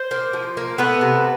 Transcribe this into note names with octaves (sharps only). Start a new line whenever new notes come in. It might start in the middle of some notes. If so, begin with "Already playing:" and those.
Already playing: C5
A#3
F3
A#3
A3 B3 B4
C3